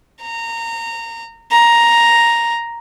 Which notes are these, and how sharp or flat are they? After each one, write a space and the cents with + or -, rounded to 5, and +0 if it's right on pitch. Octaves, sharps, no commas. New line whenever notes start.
A#5 -20
A#5 +5